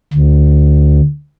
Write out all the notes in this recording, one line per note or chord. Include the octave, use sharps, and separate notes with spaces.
D2